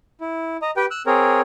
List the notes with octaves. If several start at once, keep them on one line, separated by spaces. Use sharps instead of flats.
E4
D#5 A#5
G4 B4 G5
E6 F#6
C4 G#4 A#4 C#5